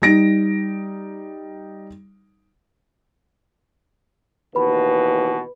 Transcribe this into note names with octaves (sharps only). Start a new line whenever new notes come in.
G3 D#4 A#6 D7
D#2 B2 E3 B4 B5